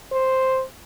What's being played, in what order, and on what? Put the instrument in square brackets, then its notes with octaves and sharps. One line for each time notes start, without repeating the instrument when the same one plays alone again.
[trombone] C5